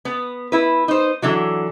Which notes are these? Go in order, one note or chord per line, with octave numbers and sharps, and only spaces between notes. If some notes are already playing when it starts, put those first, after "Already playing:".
B3
E4 B4
D#4 C5
D3 E3 F#3